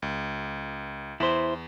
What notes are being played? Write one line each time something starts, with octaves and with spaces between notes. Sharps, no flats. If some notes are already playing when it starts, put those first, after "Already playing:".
C#2
E2 E4 C5